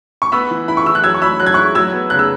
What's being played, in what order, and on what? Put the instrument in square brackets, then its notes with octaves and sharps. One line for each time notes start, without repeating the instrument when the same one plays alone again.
[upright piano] C#6
B3 B5 E6
E3
E4 B5
C#6
E3 E6
F#6
F#3 E6 G#6
C#6
F#3 B5 E6
F#3 F#6
G#6
E4 C#6 F#6
F#3 E6 G#6
B3
C#3 F#6
E6